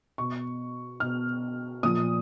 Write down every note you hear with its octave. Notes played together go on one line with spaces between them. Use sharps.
B2 C#6
B2 F6
A#2 F3 D#6